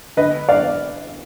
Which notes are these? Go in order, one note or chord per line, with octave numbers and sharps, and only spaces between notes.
D3 B4 D#5
D5 F5